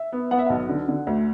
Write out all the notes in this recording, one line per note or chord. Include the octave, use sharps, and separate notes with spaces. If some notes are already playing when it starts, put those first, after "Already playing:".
Already playing: E5
B3
B3 F#5
E5
B1 F#5
D3
D3
D2